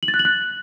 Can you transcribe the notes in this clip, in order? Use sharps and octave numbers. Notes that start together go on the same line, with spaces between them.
F#7
A6
F#6
F#7
F#6